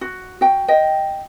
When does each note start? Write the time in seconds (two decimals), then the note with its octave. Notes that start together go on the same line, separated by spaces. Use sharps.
0.01 F#4
0.41 F#4 G5
0.68 D#5 G5